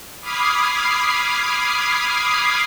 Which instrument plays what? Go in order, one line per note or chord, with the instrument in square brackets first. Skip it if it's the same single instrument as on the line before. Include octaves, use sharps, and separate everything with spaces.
[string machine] B5 D6 D#6 F6 G#6 C7